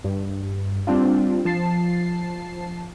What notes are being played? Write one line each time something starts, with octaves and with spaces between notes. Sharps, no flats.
G2
G3 C4 D4 F4
F3 A5 C7